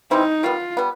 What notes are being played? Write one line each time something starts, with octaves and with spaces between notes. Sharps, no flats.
E3 G3 C4 D#4 E4
D#3 G3 B3 F4
G3 B3